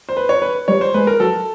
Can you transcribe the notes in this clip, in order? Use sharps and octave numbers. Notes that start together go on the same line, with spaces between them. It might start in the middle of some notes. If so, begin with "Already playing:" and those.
C5
B4
C#5
B4
G3 C#5
C5
G#3 B4
A#4
F#3 A4